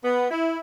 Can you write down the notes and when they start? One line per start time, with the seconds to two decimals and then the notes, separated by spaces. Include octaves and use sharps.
0.04 B3
0.30 E4